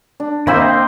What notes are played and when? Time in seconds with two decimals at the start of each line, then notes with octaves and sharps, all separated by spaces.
0.20 D4
0.47 D#3 A#3 C4 E4 C5 D#5
0.61 C5 G5 C6